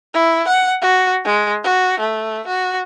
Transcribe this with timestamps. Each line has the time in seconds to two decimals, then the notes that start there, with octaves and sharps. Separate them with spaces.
0.14 E4
0.48 F#5
0.82 F#4
1.25 G#3
1.64 F#4
2.00 A3
2.47 F#4